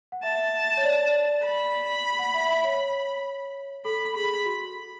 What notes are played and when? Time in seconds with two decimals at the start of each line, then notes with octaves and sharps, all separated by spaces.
0.12 F#5
0.23 E5 A5
0.77 C#5
0.84 D5
1.44 B5
2.19 F#5
2.34 E5
2.49 E5
2.64 C#5
3.85 A4 B5
4.15 G#4 B5
4.46 F#4